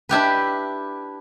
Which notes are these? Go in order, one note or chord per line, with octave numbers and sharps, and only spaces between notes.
D4 E4 G4 B4